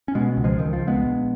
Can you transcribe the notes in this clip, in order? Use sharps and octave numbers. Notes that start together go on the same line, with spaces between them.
C#4
B2 G#3 B3
C#2
F3 G#3
C#2 D#3
F3
C#2
G#3 B3
A#1